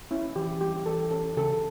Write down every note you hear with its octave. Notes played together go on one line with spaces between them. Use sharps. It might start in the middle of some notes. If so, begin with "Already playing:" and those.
C#4 E4
E3 G4
G3 G4
G4
E3 A4
C#4 A4
C#3 A4